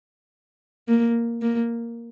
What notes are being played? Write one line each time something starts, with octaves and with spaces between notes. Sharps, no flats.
A#3
A#3